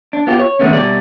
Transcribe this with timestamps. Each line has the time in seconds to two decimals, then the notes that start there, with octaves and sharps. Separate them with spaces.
0.13 D4
0.27 B3 F4 G4
0.39 C#5
0.59 D3 D#3 G#3 A3 B3 C#4
0.73 B2 G3 D5